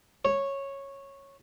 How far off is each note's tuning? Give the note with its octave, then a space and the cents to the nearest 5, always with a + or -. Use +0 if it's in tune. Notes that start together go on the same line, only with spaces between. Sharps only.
C#5 -10